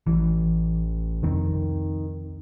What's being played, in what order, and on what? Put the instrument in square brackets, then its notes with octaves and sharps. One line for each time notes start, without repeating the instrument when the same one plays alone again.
[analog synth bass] A1 [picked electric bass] E3
[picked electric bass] C2 F2 C4 [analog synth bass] D#3